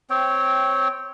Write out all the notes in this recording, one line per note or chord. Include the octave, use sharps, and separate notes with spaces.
C4 C#5 G5